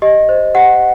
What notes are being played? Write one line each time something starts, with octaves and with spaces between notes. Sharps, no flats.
G4 D#5
C5
G4 F#5